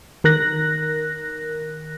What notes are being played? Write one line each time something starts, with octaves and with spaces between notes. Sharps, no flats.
D#3 A#4 F#6 A#6